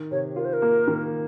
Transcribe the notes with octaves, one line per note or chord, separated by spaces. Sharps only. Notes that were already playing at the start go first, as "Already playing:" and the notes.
Already playing: D#3
C3 C#5
F4 A#4
C5
A#4
A#3
D#3